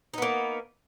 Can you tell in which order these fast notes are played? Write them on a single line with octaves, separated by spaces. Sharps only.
D#4 B3 A#3